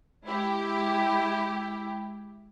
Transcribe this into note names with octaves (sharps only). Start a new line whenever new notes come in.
G#3 E4 G4